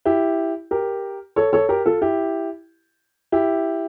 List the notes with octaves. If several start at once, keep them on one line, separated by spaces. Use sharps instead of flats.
E4 G4
G4 A#4
A4 C#5
A4 C#5
G4 A#4
F4 A4
E4 G4
E4 G4